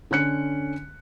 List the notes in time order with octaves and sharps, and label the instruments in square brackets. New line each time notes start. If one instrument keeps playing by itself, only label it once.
[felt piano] D3 C#4 F#6 C#7